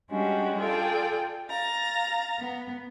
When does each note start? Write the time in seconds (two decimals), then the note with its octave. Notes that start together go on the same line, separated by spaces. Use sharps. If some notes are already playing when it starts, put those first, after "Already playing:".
0.10 G3 G#3 C#4 D4 F#4 G4
0.59 F4 G#4 A4 D5 G5
1.49 F5 A#5 A6
2.40 B3